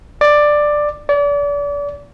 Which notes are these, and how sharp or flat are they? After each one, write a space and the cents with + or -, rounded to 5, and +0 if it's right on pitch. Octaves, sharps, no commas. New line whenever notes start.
D5 +10
D5 -35